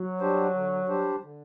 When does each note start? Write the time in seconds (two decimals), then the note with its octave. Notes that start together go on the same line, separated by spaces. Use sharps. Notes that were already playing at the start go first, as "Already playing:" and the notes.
Already playing: F#3
0.20 G3 D4 G4 C5
0.54 D3
0.89 G3 D4 G4 C5
1.23 D3